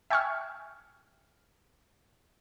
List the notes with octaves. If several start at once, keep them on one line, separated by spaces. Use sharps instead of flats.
E5 G5 G#5 C#6 E6 F6